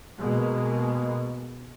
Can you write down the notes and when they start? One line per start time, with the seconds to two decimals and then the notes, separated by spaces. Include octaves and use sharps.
0.18 B2 G#3 A#3